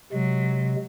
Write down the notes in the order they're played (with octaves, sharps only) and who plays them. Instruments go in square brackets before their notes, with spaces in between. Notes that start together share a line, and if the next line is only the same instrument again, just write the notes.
[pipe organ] C3 G#3 [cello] F#3